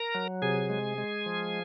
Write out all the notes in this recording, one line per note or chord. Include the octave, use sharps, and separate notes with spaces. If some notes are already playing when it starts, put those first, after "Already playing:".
Already playing: A#4 A#5
F#3
C3 G#4 G#5
G#3
G#3
F3